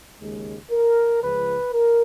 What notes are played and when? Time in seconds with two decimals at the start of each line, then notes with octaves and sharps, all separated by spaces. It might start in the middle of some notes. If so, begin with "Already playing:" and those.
0.21 D#2 C#3 G#3
0.71 A#4
1.22 C#2 C#3 F3 G#3 B4
1.73 A#4